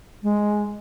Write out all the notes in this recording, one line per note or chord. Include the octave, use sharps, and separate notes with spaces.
G#3